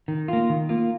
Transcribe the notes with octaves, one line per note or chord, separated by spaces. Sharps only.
D#3
A#3 F4
D#3
A#3 F4